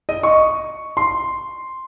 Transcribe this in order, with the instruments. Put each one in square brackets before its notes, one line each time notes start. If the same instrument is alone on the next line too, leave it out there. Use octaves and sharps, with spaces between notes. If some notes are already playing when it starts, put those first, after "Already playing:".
[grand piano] D#5
C#6
C6